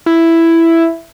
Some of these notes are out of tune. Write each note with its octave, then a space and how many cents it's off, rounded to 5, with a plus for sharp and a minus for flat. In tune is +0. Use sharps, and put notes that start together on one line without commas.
E4 +5